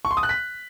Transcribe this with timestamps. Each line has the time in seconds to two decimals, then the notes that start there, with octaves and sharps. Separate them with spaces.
0.05 C#6
0.11 C6
0.17 D#6
0.23 F#6
0.29 B6